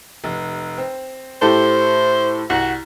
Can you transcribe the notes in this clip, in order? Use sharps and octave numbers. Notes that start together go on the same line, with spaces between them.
F1
C4
A2 G4 A4 C5
C2 F#4